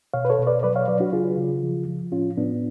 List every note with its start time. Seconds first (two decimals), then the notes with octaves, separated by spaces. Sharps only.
0.14 B2 C#5 F5
0.25 B4
0.30 A4 C#5
0.39 B2
0.47 B4 D5
0.63 F#3 B4 D5
0.76 C#5 F5
0.88 F#3 B4 D5
1.00 D4 F#4
1.13 C#3 F4 G#4
1.37 C#3
1.63 F3
1.88 F3
2.12 A2 C#4 F4
2.37 A2 B3 D4